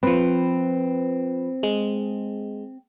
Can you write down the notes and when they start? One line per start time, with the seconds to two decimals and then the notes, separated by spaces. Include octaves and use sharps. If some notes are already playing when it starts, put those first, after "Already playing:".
0.03 F3 C4 B4
1.63 G#3